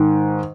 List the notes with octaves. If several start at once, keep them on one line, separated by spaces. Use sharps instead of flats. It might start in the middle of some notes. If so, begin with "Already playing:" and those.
Already playing: G#2 D#3